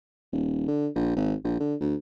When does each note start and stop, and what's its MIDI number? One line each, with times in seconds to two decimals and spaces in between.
0.32 0.64 27
0.68 0.88 50
0.95 1.15 34
1.16 1.34 32
1.44 1.58 34
1.60 1.75 50
1.81 1.95 38